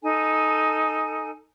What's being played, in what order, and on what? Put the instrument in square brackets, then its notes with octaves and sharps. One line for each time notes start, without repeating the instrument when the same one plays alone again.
[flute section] D#4 A4 G#5